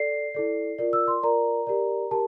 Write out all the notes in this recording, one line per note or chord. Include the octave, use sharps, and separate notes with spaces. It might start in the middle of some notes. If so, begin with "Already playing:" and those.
Already playing: A4 D5 C7
E4 A4 D5
F4 A#4 D5
E6
C6
F4 A#4 D5 A#5
G4 A#4 D5
G4 A#4 A5